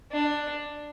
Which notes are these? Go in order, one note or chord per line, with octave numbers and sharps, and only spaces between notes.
D4